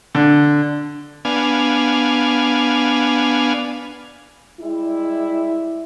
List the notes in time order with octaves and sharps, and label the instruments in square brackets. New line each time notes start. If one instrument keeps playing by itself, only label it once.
[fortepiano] D3
[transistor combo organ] B3 D4 F5 G#5
[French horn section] G3 G#3 E4